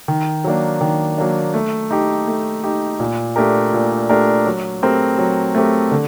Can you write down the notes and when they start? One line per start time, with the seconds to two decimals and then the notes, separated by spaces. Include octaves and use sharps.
0.08 D#3
0.44 F#3 A#3 D4
0.81 D#3
1.18 F#3 A#3 D4
1.54 A3
1.91 D#4 G4
2.27 A3
2.64 D#4 G4
3.00 A#2
3.36 A3 D4 G4 A#4
3.73 A#2
4.09 A3 D4 G4 A#4
4.46 F#3
4.82 A3 C4 G4 A#4
5.18 F#3
5.55 A3 C4 G4 A#4
5.91 D3